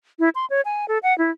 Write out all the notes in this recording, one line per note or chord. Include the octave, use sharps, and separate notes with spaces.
E4
C6
C#5
G#5
A4
F#5
E4